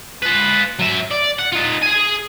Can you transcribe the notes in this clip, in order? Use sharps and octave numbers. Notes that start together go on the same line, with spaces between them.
F4 B4
F#3 E5
D5
F#5
D#4 F4
G#4 G#5